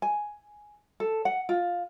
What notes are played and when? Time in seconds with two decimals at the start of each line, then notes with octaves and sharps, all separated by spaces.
0.02 G#5
1.00 A4
1.25 F#5
1.49 F4